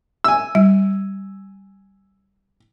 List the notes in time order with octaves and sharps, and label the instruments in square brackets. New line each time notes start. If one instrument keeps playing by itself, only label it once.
[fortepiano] G#5 E6
[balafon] G3